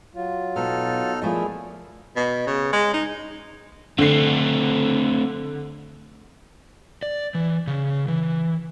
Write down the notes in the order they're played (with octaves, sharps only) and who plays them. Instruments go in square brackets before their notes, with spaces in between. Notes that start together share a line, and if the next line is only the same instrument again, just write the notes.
[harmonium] F#3 F4
[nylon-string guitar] B2 [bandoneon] D#4 A4 F6
[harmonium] A#2 E4 G#4 [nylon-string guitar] F3 A3 D#5
[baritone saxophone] B2
C#3
G#3
D#4
[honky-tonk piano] D3 C7 [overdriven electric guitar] A3 C4
[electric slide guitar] D5
E3
C#3
E3